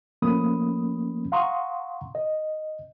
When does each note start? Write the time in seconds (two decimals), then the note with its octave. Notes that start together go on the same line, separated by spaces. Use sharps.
0.22 F3 A3 A#3 C#4 B5 D#6
1.32 F5 F#5 A#5 C6 C#6 D#6
2.15 D#5